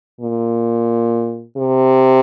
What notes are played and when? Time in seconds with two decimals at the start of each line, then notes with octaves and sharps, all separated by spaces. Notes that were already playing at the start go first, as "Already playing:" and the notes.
0.21 A#2
1.57 C3